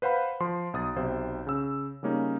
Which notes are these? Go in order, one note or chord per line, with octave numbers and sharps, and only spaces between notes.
B4 C5 F5 F#5 B5
F3 C6
B1 D#6 A6
B1 C3 C5
C#3 E6
C#3 G3 A#3 C#4 D#4